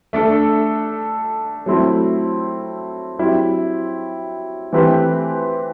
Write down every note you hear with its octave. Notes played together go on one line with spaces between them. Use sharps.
A3 D4 A4
F#3 A3 C4 E4
F#3 C4 E4 G4
E3 A3 C4 G4 B4